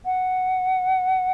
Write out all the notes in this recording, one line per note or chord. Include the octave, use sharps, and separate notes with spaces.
F#5